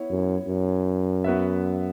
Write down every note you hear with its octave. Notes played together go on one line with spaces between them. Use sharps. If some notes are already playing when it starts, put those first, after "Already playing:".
Already playing: B3 E4 C#5
F#2
F#2
B3 F#4 B4 E5